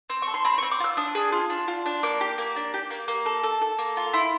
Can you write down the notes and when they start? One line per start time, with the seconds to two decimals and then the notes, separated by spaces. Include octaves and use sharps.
0.10 C4
0.22 A4 C#6
0.34 C6
0.45 C4 B5
0.58 C#6
0.63 C4
0.71 D6
0.80 F4 E6
0.97 D4 D#6
1.15 G#4
1.32 F4
1.50 D4
1.68 F4
1.86 D4
2.03 A#3 D6
2.21 G4
2.38 A#3
2.56 D4
2.74 G4
2.90 A#3
3.08 A#3
3.26 A4
3.43 A4
3.61 A4
3.79 A#3
3.97 F4
4.13 E4 C6